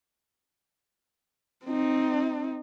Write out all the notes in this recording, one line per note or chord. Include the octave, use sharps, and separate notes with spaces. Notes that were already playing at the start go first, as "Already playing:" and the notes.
C4 D#4